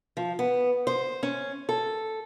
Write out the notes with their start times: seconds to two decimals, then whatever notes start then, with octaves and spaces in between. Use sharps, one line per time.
0.17 F3
0.39 B3
0.87 C5
1.23 C#4
1.69 A4